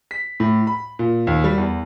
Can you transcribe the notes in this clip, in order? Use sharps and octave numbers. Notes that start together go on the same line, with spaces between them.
B6
A2
B5
A#2
D#2
G3
E2